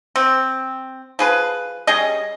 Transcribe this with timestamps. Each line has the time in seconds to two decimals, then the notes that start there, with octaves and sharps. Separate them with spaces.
0.16 C4
1.19 F3 G#4 B4
1.87 G3 C#4 G#4 D#5